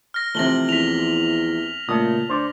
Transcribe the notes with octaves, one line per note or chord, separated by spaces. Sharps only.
F6 A#6
C3 E3 F3 A3 A#6 F#7 G7
E2 B6 F7
A#2 C#3 A3 A5 D#6
D2 C5 D5